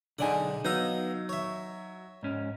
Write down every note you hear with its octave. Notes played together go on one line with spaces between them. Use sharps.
B1 D3 G#3 D4 D#4 D5 F#5 G#5
F#3 B3 D#4 F5 A#5 E6
C#5 E5
G#2 C#4